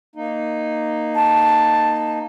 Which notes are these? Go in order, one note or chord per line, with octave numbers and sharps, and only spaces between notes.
A#3 D#4
A5